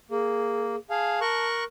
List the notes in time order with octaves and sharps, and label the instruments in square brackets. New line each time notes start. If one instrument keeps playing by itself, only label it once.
[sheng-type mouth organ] A#3 [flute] G#4
[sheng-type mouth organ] G#4 F5 [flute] A5
[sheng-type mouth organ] A#4 C#6 F#6